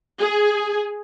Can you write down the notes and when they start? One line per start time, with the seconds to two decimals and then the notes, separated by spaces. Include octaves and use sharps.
0.19 G#4